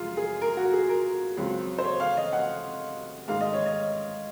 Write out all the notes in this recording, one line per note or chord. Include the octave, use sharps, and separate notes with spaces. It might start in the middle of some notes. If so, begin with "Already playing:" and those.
Already playing: F#2 C#3 F3 G#3 C#4 F4
G#4
A#4
F#4
G#4
A#4
C#2 C#3 F#3 C4
C5
C#5
F5
D#5
F#5
G#2 D#3 G#3 D#4 F5
D#5
C#5
D#5